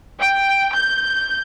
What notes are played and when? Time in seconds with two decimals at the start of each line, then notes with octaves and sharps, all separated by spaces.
0.21 G5
0.74 G6